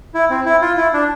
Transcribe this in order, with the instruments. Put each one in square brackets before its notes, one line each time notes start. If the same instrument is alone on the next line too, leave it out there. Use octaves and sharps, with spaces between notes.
[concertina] E4
C4
E4
F4
E4
D4